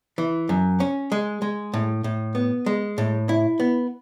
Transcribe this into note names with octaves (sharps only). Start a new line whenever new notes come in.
E3
F#2
C#4
G#3
G#3
A2
A2
B3
G#3
A2
E4
B3